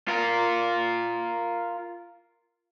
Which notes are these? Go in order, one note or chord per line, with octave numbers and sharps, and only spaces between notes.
F4 A#4